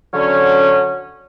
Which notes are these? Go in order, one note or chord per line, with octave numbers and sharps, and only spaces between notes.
D3 F#3 C#4